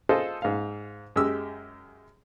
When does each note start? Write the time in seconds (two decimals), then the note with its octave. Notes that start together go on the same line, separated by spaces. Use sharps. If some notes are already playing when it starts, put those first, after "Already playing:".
0.09 F4 G#4 A4 C5 D#5
0.42 G#2 F5
1.16 F#2 G#3 G4 E6